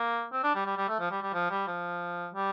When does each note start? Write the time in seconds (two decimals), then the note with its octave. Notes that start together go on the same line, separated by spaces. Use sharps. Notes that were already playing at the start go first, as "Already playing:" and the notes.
Already playing: A#3
0.33 C4
0.44 D4
0.55 G3
0.66 G3
0.77 G3
0.88 A3
1.00 F3
1.11 G3
1.22 G3
1.33 F3
1.50 G3
1.67 F3
2.34 G3